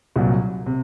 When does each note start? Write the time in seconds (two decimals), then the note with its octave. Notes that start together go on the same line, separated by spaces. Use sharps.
0.16 C2 A#2 F#3
0.66 C3